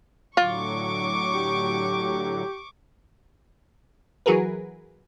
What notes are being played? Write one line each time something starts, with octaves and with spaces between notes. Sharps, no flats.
A2 D3 F#3 F4 C#6 D6
G4
E3 F#3 F#4 G#4 A#4 B4